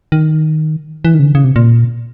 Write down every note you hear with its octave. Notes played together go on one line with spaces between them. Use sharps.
D#3
E3
D#3
C#3
D3
C#3
C3
A#2